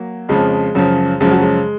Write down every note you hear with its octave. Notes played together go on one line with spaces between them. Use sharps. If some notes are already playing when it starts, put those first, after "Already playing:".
Already playing: F#3 A#3
F2 C#3 F3 G#3
F#2 C#3 F3
F#2 C#3 F3 G#3
F#3
G#3